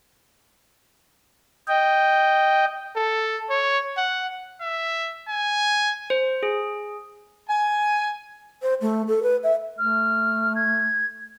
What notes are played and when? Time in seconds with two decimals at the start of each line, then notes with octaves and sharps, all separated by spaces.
1.68 D#5 G5
2.96 A4
3.50 C#5
3.97 F#5
4.62 E5
5.29 G#5
6.10 C5
6.43 G#4
7.49 G#5
8.62 C5
8.81 A3
9.08 A4
9.23 B4
9.44 E5
9.79 A3 F6
10.56 G#6